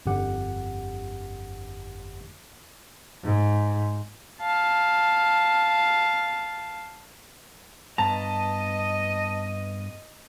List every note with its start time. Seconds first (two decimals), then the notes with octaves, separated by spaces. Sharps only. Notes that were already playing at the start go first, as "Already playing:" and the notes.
0.06 G1 F2 D3 G4 F#5
3.23 G#2
4.40 F5 A5
7.98 G2 B3 D#5 A5 A#5